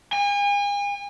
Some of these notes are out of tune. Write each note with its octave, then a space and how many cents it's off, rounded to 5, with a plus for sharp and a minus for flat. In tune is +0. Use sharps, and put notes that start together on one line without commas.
G#5 -40